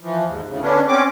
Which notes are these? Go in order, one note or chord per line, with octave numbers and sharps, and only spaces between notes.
E3 F3
D#2 G#2
D2 A2 C#3
D3 B3 C#4 D4
C4 C#4 D6